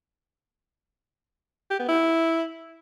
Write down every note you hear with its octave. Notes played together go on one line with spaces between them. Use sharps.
G4
B3
E4